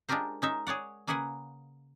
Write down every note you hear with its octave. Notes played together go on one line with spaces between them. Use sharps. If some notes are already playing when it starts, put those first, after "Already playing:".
G#3 D4 F4 G4 A#4 C5
C#4 D#4 E5
G#4 C#5 D5 F#5
C#3 A#3 G#4 B4 F#5 G#5